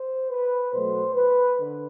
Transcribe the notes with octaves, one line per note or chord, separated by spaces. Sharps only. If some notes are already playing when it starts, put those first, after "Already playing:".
Already playing: C5
B4
B2 F#3 A3 C5
B4
D3